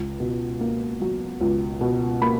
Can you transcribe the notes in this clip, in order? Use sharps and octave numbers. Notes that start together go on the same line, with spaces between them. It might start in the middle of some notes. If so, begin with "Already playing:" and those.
Already playing: C#2
B2
A#3
F#3
C#2
B2
A#3 B5